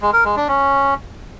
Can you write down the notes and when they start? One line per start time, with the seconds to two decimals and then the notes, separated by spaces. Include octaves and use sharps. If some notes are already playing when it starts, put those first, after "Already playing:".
0.01 G#3
0.13 A#4
0.25 G#3
0.36 D4
0.48 C#4